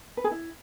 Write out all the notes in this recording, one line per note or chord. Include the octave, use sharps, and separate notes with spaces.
B4
G#4
E4